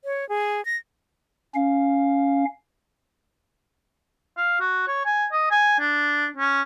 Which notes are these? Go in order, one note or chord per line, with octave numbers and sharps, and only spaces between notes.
C#5
G#4
A#6
C#4 F5
F5
F#4
C#5
G#5
D#5
G#5
D4
C#4